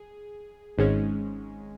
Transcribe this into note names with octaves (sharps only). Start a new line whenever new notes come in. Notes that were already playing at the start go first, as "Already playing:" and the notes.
Already playing: G#4
G#1 G#2 G#3 C#4